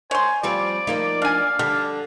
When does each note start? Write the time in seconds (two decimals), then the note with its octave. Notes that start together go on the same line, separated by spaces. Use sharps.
0.11 C5 C#5 G#5 C6
0.43 F3 G3 C4 D5 D6
0.87 F3 A#3 D#4
1.22 D4 F5 G#5
1.59 D3 G3 D4